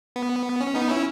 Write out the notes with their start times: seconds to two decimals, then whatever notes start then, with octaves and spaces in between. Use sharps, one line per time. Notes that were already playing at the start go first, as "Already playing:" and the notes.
0.16 B3
0.60 C#4
0.75 B3 D#4
0.89 C#4 E4